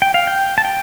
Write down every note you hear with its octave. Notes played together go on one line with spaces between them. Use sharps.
G5
F5
G5
A5
G5